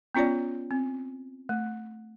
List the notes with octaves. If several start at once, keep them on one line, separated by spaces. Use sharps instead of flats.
B3 C#4 F4 C#5 D5
C4
A3